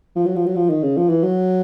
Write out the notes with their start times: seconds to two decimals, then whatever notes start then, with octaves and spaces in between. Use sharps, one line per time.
0.16 F3
0.26 F#3
0.36 F3
0.46 F#3
0.56 F3
0.70 D#3
0.83 C#3
0.97 F3
1.09 E3
1.23 F#3